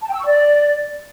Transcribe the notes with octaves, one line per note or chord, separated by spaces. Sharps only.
A5
G5
E6
C#6
D5